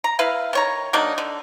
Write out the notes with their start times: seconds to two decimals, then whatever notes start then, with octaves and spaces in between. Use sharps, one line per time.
0.04 A#5
0.19 E4 B4 F5
0.53 D#3 C#5 A#5
0.93 F#3 A#3 D4 D#4
1.18 D3